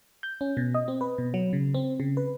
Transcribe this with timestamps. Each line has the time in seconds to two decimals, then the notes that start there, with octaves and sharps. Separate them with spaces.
0.23 G6
0.41 C#4
0.57 B2
0.74 D#5
0.88 C4
1.01 B4
1.18 B2
1.34 F#3
1.53 C#3
1.74 C4
2.00 C#3
2.17 B4